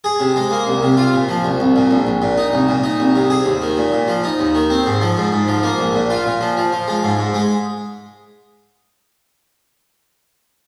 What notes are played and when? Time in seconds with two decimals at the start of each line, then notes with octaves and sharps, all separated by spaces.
0.04 G#4
0.20 C3
0.36 G#3
0.51 A#3
0.67 C2
0.83 C3
0.97 F4
1.14 A#2
1.29 F3
1.45 C2
1.60 C2
1.76 A#2
1.91 A#1
2.07 A#1
2.22 A#2
2.38 D#4
2.53 C2
2.69 A#2
2.84 D#4
3.00 C2
3.16 C3
3.30 G#4
3.46 D#2
3.62 D#3
3.77 A#2
3.92 A#2
4.08 F3
4.24 D#4
4.39 D#2
4.55 D#3
4.70 C4
4.86 G#2
5.01 F3
5.18 G#2
5.32 G#2
5.48 F3
5.63 A#3
5.79 A#1
5.95 A#2
6.10 F4
6.26 A#2
6.41 F3
6.57 F3
6.72 F3
6.88 G#3
7.03 G#2
7.19 G#2
7.34 G#3